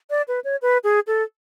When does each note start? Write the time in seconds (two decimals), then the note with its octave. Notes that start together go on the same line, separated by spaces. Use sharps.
0.10 D5
0.28 B4
0.44 C#5
0.62 B4
0.84 G#4
1.07 A4